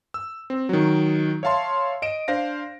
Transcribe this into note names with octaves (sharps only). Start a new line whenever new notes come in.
E6
C4
D#3 F#3
C#5 E5 F5 A5 C6
D#5 D7 E7
D4 C5 F5 A#6